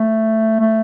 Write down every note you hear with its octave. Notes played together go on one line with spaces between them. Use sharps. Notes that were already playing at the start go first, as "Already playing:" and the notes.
Already playing: A3
A3